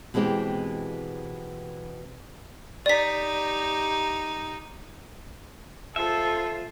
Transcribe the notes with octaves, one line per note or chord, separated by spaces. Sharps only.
B2 E3 G#3 C4 G4
D#4 G4 D5 B6
F4 A4 C5 E5